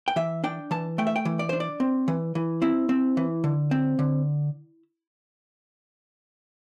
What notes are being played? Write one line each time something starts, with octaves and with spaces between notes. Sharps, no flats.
G5
E3 E5
D4 G5
E3 A5
A3 G5
E5
G5
E3
D5
D4 C5
D5
C4
E3
E3
C4 E4
C4
E3
D3
C4
D3